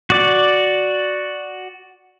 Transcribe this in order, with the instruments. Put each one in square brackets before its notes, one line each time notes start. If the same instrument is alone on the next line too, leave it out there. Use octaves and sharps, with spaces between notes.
[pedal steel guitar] F#4 D5